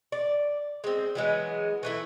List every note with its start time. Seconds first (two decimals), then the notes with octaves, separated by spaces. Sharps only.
0.12 D5
0.84 G#3 C4
1.15 E3 F#3 G#3 B3
1.83 E3 A3 E4